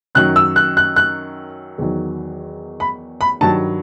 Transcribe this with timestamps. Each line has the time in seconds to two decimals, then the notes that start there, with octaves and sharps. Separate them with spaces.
0.15 F#2 D#3 F#3 F#6
0.36 E6
0.56 F#6
0.77 F#6
0.96 F#6
1.78 E2 D#3 F#3
2.80 B5
3.21 B5
3.41 G2 D#3 F#3 A5